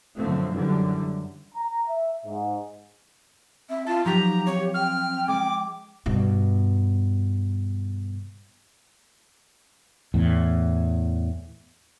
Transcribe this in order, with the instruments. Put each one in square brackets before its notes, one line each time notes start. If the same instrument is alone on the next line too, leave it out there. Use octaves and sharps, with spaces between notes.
[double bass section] F#2 B2 D3 F3 A3 C4
F#2 D3 E3 G3
[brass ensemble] A#5
E5
G#2
[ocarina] C4 [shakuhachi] E5
[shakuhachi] F4 [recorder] A5
[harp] F3 F#3 B6 [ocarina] D#4 [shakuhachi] G4 [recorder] A#5
[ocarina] C4 [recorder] C#5
[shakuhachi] G5 [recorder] F6
[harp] G#3 [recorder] D6
[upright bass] G2 B2
[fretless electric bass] E2 A2